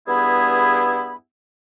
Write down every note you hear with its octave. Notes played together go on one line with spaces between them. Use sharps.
E2 G2 B3 E4 G#4 B5